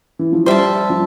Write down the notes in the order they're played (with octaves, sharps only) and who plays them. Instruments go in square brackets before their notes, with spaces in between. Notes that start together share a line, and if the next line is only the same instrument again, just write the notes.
[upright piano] E3
F3
[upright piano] G3 [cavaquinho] C5 E5 A5
[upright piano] F3